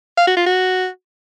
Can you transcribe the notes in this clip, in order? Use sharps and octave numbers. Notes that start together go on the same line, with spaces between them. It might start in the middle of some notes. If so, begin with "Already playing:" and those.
F5
F#4
F4
F#4